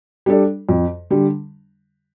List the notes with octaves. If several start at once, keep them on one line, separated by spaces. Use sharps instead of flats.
G3 D4 A4 D5
F2
D3 G3